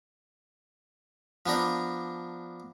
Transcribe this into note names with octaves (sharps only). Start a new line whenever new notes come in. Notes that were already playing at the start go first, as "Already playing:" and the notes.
F3 B3 D4 A#4